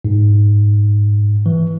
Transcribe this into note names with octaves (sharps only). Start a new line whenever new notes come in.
G#2
E3